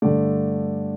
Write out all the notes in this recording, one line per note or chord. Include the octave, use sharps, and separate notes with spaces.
G2 D3 A3 D5